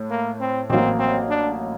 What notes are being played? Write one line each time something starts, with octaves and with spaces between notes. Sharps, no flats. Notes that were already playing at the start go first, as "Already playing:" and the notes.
Already playing: A2
A#3
C4
A1 A2 F#3 A#3 C4
C4
D4